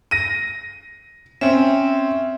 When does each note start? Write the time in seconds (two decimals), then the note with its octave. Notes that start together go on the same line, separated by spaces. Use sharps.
0.11 A#6 D#7
1.41 C4 C#4 E5